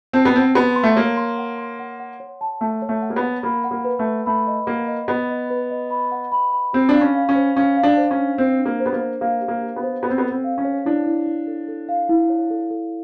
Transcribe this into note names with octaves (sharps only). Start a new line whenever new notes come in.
C4 A5
B3
C4 A5
B3 C6
C6
A3
A#3 C#5
C6
F#5
C6
F#5
F#5
C#5
A5
A3 A5
C#5
A3
F#5
A#3
B3
F#5
A#3 B5
F#5
A#3
B4
A3
B4
A3 B5
D#5
A#3 F#5
D#5
B3 D#5
D#5
B4
D#5
B5
F#5
B5
B5
C4 G4
D4
F5
C#4
F5
C#4
C5
C#4 F5
F5
D4
C5
C#4
D4
C4 C5
D4
A#3
C5
B3
A#3
C5
A#3 F5
G4
A#3
G4
B3
C5
B3 A4
C4
B3
A4
C4
F5
C#4
C#5
D4 E4
E4
E4
A4
A4
F5
E4
C#5
A4
A4